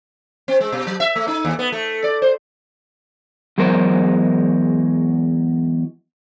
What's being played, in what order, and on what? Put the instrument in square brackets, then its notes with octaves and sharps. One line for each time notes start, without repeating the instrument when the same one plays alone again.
[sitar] C4
G#3
B2
F#3
E5
A3
D#4
D#2
B3
A3
D5
C5
[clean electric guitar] E2 F#3 G#3 A#4 C5